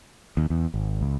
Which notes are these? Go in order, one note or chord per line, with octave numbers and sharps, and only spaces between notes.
D#2
E2
G#1
C#2